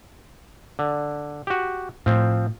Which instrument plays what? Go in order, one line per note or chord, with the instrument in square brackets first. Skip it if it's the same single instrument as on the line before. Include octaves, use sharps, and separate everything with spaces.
[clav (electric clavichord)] D3
F#4 G4
[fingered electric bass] A2 [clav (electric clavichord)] F3 C4